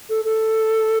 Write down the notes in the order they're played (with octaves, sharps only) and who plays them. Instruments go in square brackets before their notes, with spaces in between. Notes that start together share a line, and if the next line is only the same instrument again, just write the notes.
[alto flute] A4
A4